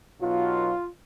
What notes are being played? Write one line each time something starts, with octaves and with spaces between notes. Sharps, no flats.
B1 B2 F#3 F4